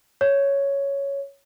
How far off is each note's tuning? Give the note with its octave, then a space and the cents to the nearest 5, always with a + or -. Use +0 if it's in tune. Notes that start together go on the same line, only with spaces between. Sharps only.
C#5 +5